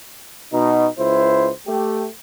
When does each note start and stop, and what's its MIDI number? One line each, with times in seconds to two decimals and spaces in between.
0.52 0.87 47
0.52 0.87 63
0.97 1.50 37
0.97 1.50 64
0.97 1.50 72
1.66 2.06 57
1.66 2.06 67